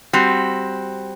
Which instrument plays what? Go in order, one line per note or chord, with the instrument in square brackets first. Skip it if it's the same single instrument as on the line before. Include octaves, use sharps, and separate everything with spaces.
[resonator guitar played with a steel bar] G3 C4 F#4